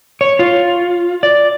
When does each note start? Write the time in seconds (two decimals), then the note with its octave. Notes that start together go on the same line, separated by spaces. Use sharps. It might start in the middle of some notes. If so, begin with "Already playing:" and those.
0.21 C#5
0.39 F4
1.23 D5